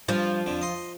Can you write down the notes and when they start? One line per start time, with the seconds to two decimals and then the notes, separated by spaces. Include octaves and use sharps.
0.09 G2 F3
0.46 F2 D3
0.61 D#5 C6